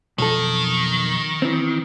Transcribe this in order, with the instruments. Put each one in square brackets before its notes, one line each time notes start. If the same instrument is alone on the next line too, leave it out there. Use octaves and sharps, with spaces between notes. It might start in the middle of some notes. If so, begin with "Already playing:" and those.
[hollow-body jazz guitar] B1 F2 A4 [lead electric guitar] D#3
[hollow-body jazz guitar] E3 C4